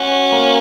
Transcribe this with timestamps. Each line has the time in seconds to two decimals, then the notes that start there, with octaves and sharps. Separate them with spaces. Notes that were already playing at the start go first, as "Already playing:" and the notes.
Already playing: C#4 F#4
0.32 A#3